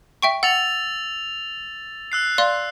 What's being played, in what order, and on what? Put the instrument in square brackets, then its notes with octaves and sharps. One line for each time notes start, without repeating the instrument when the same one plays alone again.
[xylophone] E5 G5 C#6
[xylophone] F#5 [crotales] E6 A6 F7
[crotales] E6 F#6 C7
[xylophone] D5 F5 C6